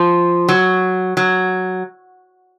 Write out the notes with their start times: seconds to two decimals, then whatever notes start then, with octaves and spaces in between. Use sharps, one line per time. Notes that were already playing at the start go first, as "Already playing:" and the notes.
Already playing: F3
0.48 F#3
1.17 F#3